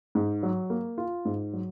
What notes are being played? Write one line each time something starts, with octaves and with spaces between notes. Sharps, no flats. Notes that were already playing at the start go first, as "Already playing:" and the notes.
G#2
F#3
A#3
F4
G#2
F#3